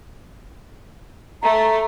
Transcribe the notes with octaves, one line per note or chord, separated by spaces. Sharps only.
A3 A#5